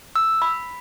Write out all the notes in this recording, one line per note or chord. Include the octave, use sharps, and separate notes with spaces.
E6
B5